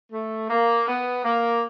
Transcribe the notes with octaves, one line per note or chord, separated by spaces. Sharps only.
A3
A#3
B3
A#3